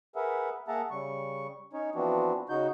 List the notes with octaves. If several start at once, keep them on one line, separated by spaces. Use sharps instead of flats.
G#4 A#4 B4 E5 F#5
A#3 G#4 E5 F#5 A5 A#5
C#3 G3 C#6
C#4 D#4 C#5
E3 F3 B3 C4 D4 F#4
C#3 D#4 F#4 G6